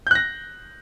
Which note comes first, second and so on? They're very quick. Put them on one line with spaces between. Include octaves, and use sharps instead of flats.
G6 F#6 A#6